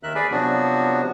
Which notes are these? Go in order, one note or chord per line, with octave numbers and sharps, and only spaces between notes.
D#2 D#3 A#4 E5 F#6
G#4 B4 D5 G#5 B5
C3 F3 F#3 B3 D4 F#4